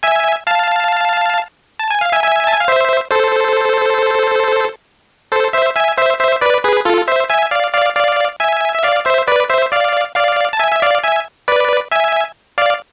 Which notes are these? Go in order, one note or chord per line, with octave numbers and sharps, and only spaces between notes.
E5 G#5
F5 A5
A5
G#5
F5
E5 G#5
E5 G#5
A5
G#5
F5
C5 E5
A4 C5
A4 C5
C5 E5
E5 G#5
C5 E5
C5 E5
B4 D5
G#4 B4
F4 A4
C5 E5
E5 G#5
D5 F5
D5 F5
D5 F5
E5 G#5
E5
D5 F5
C5 E5
B4 D5
C5 E5
D5 F5
D5 F5
A5
E5 G#5
E5
D5 F5
E5 G#5
B4 D5
E5 G#5
D5 F5